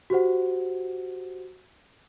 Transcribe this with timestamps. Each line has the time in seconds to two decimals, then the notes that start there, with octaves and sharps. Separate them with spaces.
0.10 F#4 G4 C5 F#5